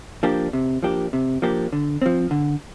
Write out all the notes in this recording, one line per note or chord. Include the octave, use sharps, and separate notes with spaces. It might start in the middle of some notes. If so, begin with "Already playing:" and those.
F3 A#3 D4 G4
C3
F3 A#3 D4 G4
C3
F3 A#3 D4 G4
D3
F3 C4
D3